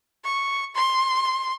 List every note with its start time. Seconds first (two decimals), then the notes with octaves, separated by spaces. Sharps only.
0.24 C#6
0.75 C6